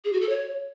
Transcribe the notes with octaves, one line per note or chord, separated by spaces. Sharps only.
G#4
F#4
A4
C#5